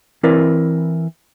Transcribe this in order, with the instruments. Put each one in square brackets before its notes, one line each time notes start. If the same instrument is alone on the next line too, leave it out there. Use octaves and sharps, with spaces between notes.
[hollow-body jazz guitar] E3 C4 E4 A#4 B4 D5